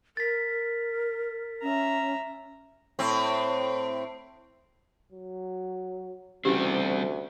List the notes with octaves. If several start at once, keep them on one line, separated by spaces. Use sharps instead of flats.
A#4 A6 B6
C#4 E5 A#5
A2 C4
F#3
D2 C#3 E3 G3 C4 F#4 G4